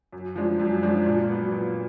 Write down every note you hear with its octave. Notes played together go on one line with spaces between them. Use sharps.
F#2
F3 G#3 D4
F#2
F3 G#3 D4
A#2
F#3 B3
A#2